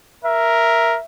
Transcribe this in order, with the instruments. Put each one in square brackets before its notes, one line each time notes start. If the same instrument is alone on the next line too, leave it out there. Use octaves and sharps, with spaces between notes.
[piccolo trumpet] A#4 [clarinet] E5